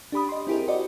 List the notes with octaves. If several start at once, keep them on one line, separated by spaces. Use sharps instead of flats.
D4 G4 B5 D#6
D#5 C6
C4 E4 G4 G#4 A#4
F#4 C5 D5 D#5